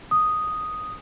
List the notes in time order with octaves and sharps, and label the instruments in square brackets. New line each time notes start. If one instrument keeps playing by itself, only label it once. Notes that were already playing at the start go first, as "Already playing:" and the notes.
[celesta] D#6